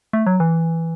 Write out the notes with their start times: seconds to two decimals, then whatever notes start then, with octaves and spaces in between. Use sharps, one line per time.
0.13 A3
0.26 F#3
0.40 E3